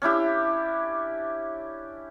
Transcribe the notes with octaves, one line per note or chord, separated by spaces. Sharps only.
C#4 D4 E4 G4